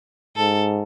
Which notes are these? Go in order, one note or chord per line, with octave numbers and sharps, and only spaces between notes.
G#2 A4